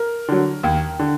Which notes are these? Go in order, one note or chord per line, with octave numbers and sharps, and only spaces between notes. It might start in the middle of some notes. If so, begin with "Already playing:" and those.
Already playing: A#4
D3 F#3
D#2
D3